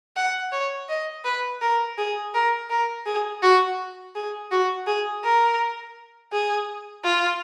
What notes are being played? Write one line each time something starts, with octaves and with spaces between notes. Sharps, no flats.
F#5
C#5
D#5
B4
A#4
G#4
A#4
A#4
G#4
F#4
G#4
F#4
G#4
A#4
G#4
F4